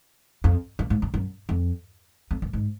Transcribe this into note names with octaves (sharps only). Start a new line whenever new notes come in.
F2
F#2
G#2
F#2
F#2
F2
F2
F#2
G#2